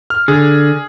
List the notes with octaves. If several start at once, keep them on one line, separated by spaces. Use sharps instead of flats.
F6
D3 G#4